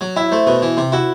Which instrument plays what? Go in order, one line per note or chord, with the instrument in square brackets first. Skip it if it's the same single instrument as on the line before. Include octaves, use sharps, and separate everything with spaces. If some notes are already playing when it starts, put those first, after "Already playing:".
[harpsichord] F#3
[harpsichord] E4 [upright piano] E5
[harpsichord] A3 [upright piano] C5
[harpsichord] B2 [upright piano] B4
[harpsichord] E3
C3
[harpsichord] E4 [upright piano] F#4